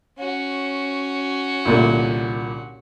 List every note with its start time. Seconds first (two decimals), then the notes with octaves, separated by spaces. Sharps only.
0.19 C#4 F#4
1.65 C2 A#2 D3